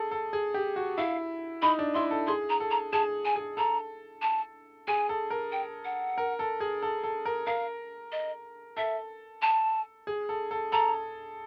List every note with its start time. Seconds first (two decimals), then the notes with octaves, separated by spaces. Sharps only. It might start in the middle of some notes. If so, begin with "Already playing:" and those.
Already playing: G#4 A4
0.11 A4
0.33 G#4
0.54 G4
0.76 F#4
0.98 E4 F5
1.62 D#4 B5
1.79 D4
1.94 E4 C6
2.11 A4
2.27 G#4 C6
2.50 A#5
2.60 A4
2.71 A#5
2.93 G#4 A5
3.25 G#5
3.36 G#4
3.57 A4 A#5
4.22 A5
4.88 G#4 G#5
5.09 A4
5.30 A#4
5.52 G5
5.85 F#5
6.18 A#4
6.39 A4
6.60 G#4
6.82 A4
7.04 A4
7.25 A#4
7.47 A#4 F5
8.12 D#5
8.77 A4 E5
9.42 A5
10.07 G#4
10.29 A4
10.51 A4
10.72 A4 A#5